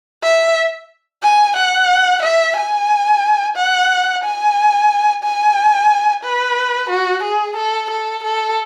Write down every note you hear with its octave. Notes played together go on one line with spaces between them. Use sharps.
E5
G#5
F#5
E5
G#5
F#5
G#5
G#5
B4
F#4
G#4
A4
A4
A4